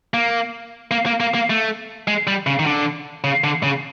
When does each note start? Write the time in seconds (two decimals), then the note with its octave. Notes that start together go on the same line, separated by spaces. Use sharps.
0.14 A#3
0.91 A#3
1.06 A#3
1.20 A#3
1.35 A#3
1.50 A3
2.08 G#3
2.27 G3
2.47 C#3
2.59 D#3
2.66 D3
3.24 C#3
3.44 D3
3.63 C#3